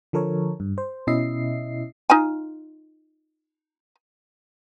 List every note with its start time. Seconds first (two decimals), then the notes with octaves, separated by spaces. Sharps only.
0.13 D3 F3 A4 A#4 C#5
0.60 G2
0.78 C5
1.07 B2 C#4 E4 D#5 E5 C7
2.10 D#4 F4 G#5